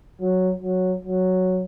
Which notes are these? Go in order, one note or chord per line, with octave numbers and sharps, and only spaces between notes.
F#3
F#3
F#3